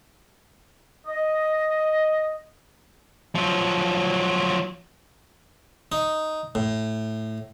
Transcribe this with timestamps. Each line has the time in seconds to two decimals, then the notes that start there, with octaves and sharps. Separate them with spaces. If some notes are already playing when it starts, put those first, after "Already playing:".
1.06 D#5
3.35 F3 F#3
5.92 D#4
6.55 A2